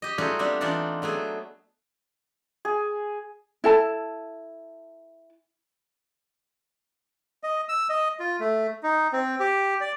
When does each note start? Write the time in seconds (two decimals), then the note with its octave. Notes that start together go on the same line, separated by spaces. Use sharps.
0.02 G4 D#5
0.18 G3 A3 D#4 F4 F#4 G#4
0.39 G3 B3 C4 D4
0.61 E3 D4 D#4 F4 D5 F#5
1.02 F#3 A3 B3 G#4
2.65 G#4
3.64 E4 A4 A5
7.43 D#5
7.69 E6
7.90 D#5
8.20 F4
8.40 A3
8.83 D#4
9.13 C4
9.40 G4
9.81 D5